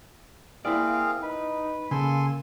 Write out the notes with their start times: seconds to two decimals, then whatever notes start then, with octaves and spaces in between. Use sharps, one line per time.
0.65 A#3 C4 E4 G#4 D5 F5
1.22 D#4 B4
1.91 C#3 A#3 A4 G#5 C6